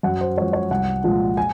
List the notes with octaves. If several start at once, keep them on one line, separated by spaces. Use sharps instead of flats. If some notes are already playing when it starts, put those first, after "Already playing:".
F#2 F#5
C5
F3 G#3 C#5
C#5
C2 F#5
A#2 F3 G#3
G#5